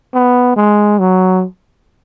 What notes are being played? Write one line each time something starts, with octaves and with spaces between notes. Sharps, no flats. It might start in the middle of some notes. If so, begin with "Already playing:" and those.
B3
G#3
F#3